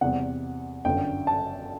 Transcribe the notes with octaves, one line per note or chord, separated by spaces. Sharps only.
E2 C3 G3 C4 F#5
G1 F#2 D3 G5
A5